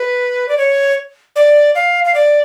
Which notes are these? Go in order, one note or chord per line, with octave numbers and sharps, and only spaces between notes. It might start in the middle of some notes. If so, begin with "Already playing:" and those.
Already playing: B4
D5
C#5
D5
F5
F5
D5